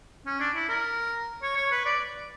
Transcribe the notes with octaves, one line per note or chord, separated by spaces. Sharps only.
C#4
D4
E4
A#4
C#5
C#5
B4
D5